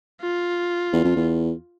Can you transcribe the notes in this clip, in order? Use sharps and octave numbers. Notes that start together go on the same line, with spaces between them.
F4
E2
F2
E2